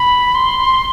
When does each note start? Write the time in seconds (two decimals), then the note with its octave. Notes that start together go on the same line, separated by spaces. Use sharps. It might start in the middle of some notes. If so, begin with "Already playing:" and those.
Already playing: B5
0.35 C6